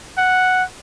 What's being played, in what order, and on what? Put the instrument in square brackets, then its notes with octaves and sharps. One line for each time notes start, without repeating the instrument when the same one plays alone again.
[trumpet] F#5